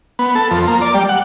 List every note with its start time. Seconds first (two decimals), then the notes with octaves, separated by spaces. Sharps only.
0.19 B3
0.35 A4
0.51 F2
0.67 A#3
0.82 D5
0.94 G3
1.09 F#5